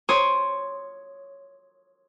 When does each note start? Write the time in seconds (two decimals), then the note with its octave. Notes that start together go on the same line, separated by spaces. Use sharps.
0.09 C#5 C6 D6 D#6